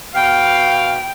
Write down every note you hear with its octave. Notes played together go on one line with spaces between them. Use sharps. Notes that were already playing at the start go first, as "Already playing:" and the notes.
B2 F5 G5